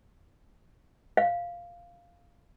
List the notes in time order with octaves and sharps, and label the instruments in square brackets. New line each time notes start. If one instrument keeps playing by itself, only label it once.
[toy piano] F5